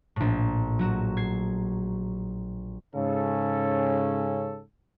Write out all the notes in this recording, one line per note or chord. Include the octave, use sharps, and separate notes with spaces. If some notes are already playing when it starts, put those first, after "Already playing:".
A#1 A2
F#3 F#4 E7
G#6 C7
G#2 C#3 C#4 A4